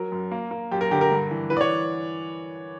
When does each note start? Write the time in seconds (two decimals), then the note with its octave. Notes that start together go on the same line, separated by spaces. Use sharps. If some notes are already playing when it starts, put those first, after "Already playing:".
Already playing: F#3 A#4
0.12 F#2
0.31 A#3
0.51 A#3
0.71 F#2 G4
0.81 A#4
0.91 D3 G4
1.01 A#4
1.12 G2
1.31 E3
1.50 E3 B4
1.57 D5
1.61 C#5